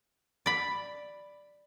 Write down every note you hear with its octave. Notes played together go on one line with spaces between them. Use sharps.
D5 B5